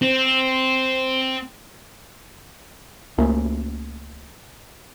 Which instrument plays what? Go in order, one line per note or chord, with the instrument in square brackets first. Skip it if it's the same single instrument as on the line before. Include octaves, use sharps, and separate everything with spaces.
[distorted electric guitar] C4
[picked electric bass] C#2 A3 A#3 C#4